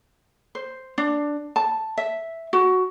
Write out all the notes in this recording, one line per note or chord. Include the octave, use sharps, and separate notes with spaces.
C5
D4
A5
E5
F#4